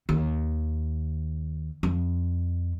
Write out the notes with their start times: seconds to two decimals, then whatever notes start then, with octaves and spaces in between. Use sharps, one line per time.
0.09 D#2
1.83 F2